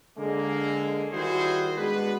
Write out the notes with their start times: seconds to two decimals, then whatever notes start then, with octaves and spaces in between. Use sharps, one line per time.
0.18 D3 G#3 A#3
1.13 D#3 G3 E4 F#4 G#4 C5
1.77 G#3 B3 D4 F#4 B4